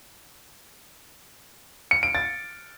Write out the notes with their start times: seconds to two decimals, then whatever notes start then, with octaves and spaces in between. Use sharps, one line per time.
1.91 C#7
2.03 D7
2.15 A6